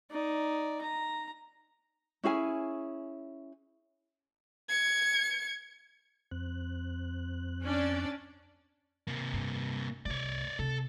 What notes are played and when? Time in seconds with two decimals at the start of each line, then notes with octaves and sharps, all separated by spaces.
0.11 D#4 D5
0.82 A#5
2.24 C#4 E4 G#4 G#5
4.69 G#6 C#7
6.31 F2 C4 F#6
7.61 C#4 D4 D5
9.07 C3 A#3
9.33 G2
10.06 C2 A3 C#5 D5
10.59 C3 A4